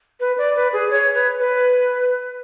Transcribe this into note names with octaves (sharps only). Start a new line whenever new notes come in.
B4
D5
B4
G#4
C#5
B4
B4